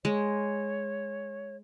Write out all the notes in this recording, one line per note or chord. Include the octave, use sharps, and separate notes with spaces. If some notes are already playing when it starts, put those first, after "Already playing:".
G#3 C#5